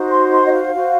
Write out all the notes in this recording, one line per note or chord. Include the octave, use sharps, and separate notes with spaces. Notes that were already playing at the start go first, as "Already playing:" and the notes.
Already playing: D#4 F#4 C5
C6
C6
D#5
F5
F#4 C5